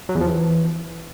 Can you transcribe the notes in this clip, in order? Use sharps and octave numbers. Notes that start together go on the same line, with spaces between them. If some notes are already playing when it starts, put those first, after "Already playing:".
F#3
E2
F3
E3